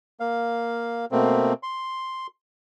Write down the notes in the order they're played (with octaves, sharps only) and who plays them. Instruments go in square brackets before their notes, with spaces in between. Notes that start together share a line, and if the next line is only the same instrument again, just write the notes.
[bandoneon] A#3 F5
B2 A3 A#3 C4
C6